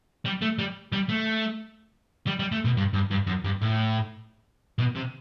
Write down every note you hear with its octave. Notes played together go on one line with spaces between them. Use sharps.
G3
A3
G3
G3
A3
G3
G3
A3
B2
G2
G2
G2
F#2
G2
A2
B2
C3